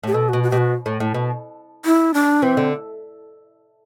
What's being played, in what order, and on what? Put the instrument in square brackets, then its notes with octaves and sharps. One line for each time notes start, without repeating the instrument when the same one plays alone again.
[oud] A2 [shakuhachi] G4
[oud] B2 [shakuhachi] A4
[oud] B2 [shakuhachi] F#4
[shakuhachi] F#4
[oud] B2 [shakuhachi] G4
[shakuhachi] F#4
[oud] A2
A2
B2
[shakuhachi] E4
D4
[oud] E3 [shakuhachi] C4
[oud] D3